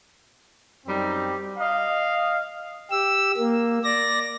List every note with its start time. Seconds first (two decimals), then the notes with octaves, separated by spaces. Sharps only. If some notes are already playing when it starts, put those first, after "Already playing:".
0.86 F#2 G3 C4 D#4
1.57 D#5 F5
2.91 G4 E6
3.37 A#3
3.84 D5 A#6